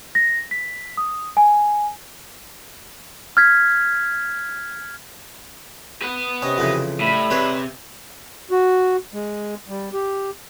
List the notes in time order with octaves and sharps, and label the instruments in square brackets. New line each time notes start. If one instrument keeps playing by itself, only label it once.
[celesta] A#6
B6
D#6
G#5
[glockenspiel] F6 G#6 B6
[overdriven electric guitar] B4 F#5
[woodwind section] C3 D#5 [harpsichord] C#4
[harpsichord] F2 C#3 E3
[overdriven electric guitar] A2 [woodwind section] G3 E5 B5
[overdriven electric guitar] C3 [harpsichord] G#4 B4 C#5
[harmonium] F#4
G#3
G3
G4